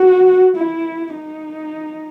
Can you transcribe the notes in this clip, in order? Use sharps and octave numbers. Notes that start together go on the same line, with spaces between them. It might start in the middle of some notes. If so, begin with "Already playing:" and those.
Already playing: F#4
E4
D#4